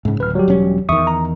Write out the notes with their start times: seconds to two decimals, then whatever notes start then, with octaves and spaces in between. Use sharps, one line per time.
0.05 G#2 C#3
0.20 D1 B4 F6
0.35 F#3 G3 G4
0.48 E1 C#4
0.89 E2 D#3 E5 C#6 D#6
1.07 A#5